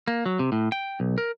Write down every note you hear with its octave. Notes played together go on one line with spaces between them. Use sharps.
A#3
F#3
C3
A2
G5
B1
A#4